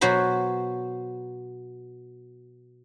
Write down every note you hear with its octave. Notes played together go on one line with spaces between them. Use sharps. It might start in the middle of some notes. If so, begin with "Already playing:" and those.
B2 F#3 F#4 C5 B5